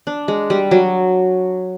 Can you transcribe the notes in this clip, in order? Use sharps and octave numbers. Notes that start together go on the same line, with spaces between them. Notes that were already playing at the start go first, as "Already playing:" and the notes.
D4
G#3
G3
F#3